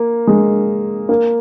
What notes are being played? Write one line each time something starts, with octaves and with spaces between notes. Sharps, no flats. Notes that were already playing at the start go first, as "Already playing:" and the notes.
Already playing: A#3
G#3
A#3